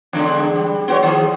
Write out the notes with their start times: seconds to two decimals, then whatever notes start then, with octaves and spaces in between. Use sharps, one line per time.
0.13 E2 D3 G#3
0.56 G3
0.88 B3 F#4 C#5
1.03 D#3 F3 G#4